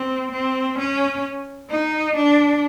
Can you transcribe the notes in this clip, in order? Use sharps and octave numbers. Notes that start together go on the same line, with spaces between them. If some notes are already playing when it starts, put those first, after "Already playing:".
Already playing: C4
C4
C#4
D#4
D4